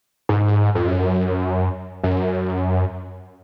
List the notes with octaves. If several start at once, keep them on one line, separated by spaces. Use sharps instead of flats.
G#2
F2
F#2
F#2